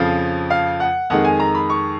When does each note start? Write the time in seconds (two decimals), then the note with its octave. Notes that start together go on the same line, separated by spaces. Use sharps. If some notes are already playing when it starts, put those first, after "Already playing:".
Already playing: F2 C#3 F3 F5
0.50 F5
0.80 F#5
1.10 F2 D#3 G#3 F#5
1.25 G#5
1.40 A#5
1.55 B5
1.70 C#6